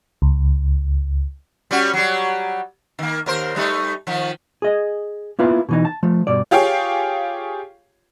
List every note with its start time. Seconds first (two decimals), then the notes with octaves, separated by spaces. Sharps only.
0.22 C#2
1.71 G3 C#4 F#4
1.93 F#3 G3
2.99 D#3 A#3
3.26 D#2 A#4 C5
3.56 G3 A3 D#4
4.07 D#3 F3
4.62 G#4 D#5
5.39 A#3 B3 E4 F4 B4 F5
5.69 B2 E3 D#4
5.85 A5
6.03 F3 A3
6.27 G2 B2 D5
6.51 F4 G4 G#4 C#5 F5 G5